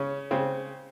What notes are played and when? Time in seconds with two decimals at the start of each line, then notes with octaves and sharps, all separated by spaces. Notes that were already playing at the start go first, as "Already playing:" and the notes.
Already playing: C#3 C#4
0.31 C#3 C4